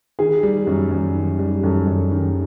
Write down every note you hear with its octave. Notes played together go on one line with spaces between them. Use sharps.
D#3 G#4
G3
F#2
F#2
D#3
G3
F#2 A4
F#2
D#3